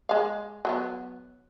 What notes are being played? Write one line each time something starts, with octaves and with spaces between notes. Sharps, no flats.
G#3 F5
F#3 A#3 B3